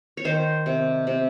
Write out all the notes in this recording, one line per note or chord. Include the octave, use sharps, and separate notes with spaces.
C#5
D#3 C5
C3
C3